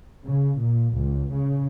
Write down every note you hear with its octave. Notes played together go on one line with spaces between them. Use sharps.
C#3
A#2
C#2
C#3